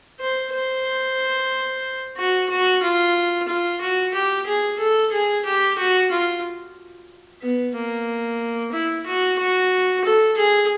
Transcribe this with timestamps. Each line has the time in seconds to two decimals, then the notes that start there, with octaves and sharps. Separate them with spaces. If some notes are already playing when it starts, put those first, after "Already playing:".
0.20 C5
0.53 C5
2.17 F#4
2.49 F#4
2.82 F4
3.48 F4
3.81 F#4
4.14 G4
4.46 G#4
4.79 A4
5.12 G#4
5.45 G4
5.78 F#4
6.11 F4
7.42 B3
7.75 A#3
8.72 E4
9.06 F#4
9.39 F#4
10.04 A4
10.37 G#4